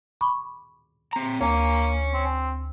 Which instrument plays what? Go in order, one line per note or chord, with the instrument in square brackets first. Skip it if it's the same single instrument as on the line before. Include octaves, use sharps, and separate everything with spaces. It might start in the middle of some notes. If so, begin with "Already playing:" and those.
[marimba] B5 C#6 D6
[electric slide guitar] C4 A#5
[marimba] D2 [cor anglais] A#3 [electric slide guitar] C#5 G#5
[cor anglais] C4